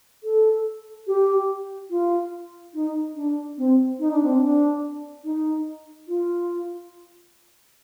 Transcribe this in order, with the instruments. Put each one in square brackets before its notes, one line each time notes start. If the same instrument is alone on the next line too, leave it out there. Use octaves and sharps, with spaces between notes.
[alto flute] A4
G4
F4
D#4
D4
C4
D#4
D4
C4
D4
D#4
F4